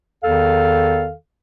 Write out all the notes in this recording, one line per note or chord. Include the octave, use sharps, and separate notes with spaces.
E2 D#3 A4 F5